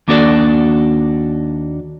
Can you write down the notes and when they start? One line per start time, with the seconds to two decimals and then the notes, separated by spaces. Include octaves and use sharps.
0.08 D#2 A#3 D4 F#4 A4 D5